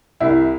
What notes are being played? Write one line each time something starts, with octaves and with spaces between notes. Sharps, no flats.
C2 E4